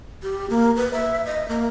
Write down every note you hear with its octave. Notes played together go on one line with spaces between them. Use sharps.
G4
A#3
B4
E5
D#5
A#3